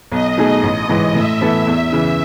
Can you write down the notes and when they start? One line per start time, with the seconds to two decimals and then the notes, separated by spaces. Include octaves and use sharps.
0.11 B1 D#5
0.37 B2 A3 D#4 G#4
0.63 A1
0.89 G#2 E3
1.15 A2 E5
1.41 E3 B3 E4 A4
1.67 E2
1.92 C#3 E3